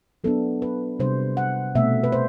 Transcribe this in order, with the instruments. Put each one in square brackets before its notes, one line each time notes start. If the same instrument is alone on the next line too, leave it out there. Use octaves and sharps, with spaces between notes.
[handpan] F#3 B3 D4 A4
B4
C3 G3 D4 C5
F#5
B2 A3 C4 E5
B4
C5